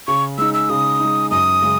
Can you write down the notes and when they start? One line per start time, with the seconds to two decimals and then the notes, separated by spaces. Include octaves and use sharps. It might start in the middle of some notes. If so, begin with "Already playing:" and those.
0.07 C#3 C#6
0.38 G#3 D#4 E6
0.54 E6
0.69 C#3 D#6
1.00 G#3 D#4
1.31 F#2 D#6
1.62 C#3 G#3